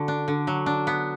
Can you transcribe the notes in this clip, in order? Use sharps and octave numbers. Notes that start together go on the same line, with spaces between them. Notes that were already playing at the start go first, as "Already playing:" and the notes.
Already playing: D3 F#4
D4
D3
F#3
D4
B3